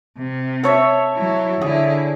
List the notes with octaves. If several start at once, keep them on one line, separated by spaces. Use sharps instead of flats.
C3
A4 C#5 E5
F#3 E4
D3 E4 G#4